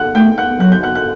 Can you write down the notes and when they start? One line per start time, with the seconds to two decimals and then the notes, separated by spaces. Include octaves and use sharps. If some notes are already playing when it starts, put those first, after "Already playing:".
Already playing: F#5 F#6
0.15 A3 G5 G6
0.38 F#5 F#6
0.59 F#3 F#6
0.72 G6
0.83 F#5 F#6
0.95 F#6